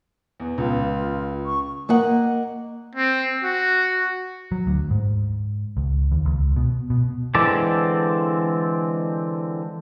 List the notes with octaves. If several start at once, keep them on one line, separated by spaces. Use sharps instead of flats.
E2
C#2 F4
C#6
A#3 D#5 F#5
C4
F#4
F#3
D2
G#2
C#2
D#2
C#2
B2
B2
D3 E3 G#3 C4 A4 D5